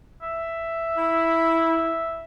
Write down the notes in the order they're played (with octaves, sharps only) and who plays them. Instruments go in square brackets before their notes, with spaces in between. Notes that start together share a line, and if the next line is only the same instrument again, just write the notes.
[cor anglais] E5
[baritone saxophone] E4